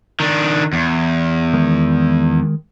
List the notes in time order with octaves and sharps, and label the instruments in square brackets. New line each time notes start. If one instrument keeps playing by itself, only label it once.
[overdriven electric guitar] D#3 D4
E2
[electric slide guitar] D#3 G#3 A#4